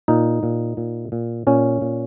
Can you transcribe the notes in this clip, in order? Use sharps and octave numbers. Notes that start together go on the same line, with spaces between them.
A#2 D#4
A#2
A#2
A#2
A#2 C#4
A#2